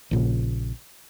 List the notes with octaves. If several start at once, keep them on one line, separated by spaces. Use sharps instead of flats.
A#1 A#2 C#3